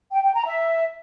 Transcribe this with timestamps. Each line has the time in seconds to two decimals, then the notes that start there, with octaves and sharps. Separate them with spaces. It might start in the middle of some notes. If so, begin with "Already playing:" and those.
0.12 G5
0.23 G5
0.34 A#5
0.46 E5